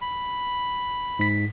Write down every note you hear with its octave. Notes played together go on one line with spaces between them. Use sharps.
B5
G#2 B6